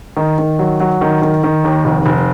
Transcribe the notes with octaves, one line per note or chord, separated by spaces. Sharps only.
D#3
D#3
F#3
F#3
D#3
D#3
D#3
D#2
F1
F1